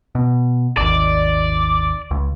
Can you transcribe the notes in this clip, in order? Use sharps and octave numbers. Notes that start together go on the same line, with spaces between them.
B2
G#1 D#2 D5
C#2